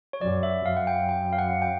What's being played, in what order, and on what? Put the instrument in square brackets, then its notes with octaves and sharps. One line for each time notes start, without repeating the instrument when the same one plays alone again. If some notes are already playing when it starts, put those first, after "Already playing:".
[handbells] C#5
[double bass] F#2 [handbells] D5
[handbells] E5
[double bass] F#2 [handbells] F5
[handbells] F#5
G5
G5
F5
F#5
G5